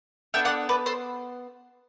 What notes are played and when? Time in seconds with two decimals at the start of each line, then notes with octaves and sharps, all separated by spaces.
0.34 B3 D4 A4 E5 G5
0.45 D5 F#5
0.69 B4 D5
0.86 A4 C5